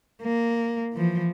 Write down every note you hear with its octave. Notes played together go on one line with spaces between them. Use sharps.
A#3
E3 F3